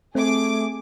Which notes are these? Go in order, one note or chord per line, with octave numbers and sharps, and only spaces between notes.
A3 C4 G#4 D6